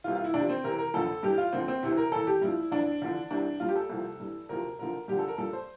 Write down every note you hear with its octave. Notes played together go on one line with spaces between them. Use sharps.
C2 C3 E3 F4
F4
E4
E2 C3 F3 D4
C4
E2 C3 E3 A#4
A#4
F2 D3 F3 A4
G2 E3 G4
F4
D2 D3 F3 C4
C4
D2 C3 E3 E4
A#4
E2 E3 A4
G4
G2 F3 E4
F2 E3 D4
E2 D3 F3
C2 C3 E3 D4
G2 F3 F4
G4
A4
C2 C3 F3
G2 E3
D2 C3 F3 A#4
D2 D3 F3 A#4
G2 D3 F3 G4
A4
A#4
G2 F3 A4
C5